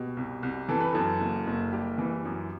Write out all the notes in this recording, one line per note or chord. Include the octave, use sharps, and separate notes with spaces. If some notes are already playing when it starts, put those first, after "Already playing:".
Already playing: B2 G4
C2
C2
E3 A4
B4
F#2 A4
F#1
F#1
G3 G4
E3
F#2